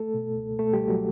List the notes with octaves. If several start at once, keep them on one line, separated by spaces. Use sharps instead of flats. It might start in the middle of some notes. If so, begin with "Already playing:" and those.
Already playing: A3 A4
B2
C#2
B2 A3 A4
G3 G4
C#2
F#3 F#4